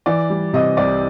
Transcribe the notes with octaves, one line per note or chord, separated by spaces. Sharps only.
E3 D5
G3
C3 D#5
C2 D5